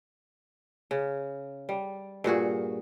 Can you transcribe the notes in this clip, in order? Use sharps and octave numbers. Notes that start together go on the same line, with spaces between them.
C#3
G3
G2 A#2 F#4 G#4